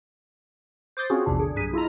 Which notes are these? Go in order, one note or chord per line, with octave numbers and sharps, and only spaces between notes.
C5 D6 D#6 G6 A6
C4 C#4 F4 F#4 G#4
A#1 E2 C3 D4
D3 G#4
B1 G2 G#4 B6 D#7
E4 F4 A4 D#5 A#5